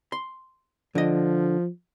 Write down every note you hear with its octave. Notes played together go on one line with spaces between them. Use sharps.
C6
D3 F3 D#5